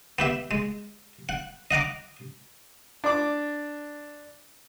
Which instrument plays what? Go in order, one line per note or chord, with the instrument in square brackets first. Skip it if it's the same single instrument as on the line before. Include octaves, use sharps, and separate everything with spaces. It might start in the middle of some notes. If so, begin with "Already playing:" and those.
[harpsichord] B3 G4 E5
G#3
F#5
D#5 F#5 A#5 D6
[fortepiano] D4 D6